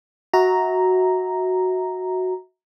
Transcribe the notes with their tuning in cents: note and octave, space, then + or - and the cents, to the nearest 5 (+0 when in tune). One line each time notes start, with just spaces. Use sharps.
F#4 +0 E5 -30 A#5 +0